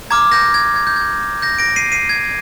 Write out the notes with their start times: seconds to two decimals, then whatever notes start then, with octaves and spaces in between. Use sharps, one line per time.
0.10 A#5 D6 F6 G#6
0.32 G6 A#6
0.54 G#6
0.76 G#6
0.87 G6
0.96 G#6
1.42 G6 A#6
1.59 A#6 D7
1.76 C7 D#7
1.92 C7 D#7
2.09 G#6